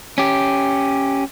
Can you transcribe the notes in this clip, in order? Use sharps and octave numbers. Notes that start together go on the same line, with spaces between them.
C#4 G4